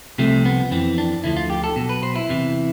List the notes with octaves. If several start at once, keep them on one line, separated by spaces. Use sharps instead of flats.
C2 C3 F3 A3
B3
F2 E3 C4
D4
D2 D3 F3 E4
F4
G4
A4
B1 B2
B4
C5
E4
E2 C3 E3